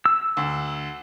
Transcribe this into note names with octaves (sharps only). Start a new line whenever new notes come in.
E6
D2